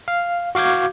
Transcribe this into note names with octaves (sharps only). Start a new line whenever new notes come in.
F5
F#4 F5 D6 G6 G#6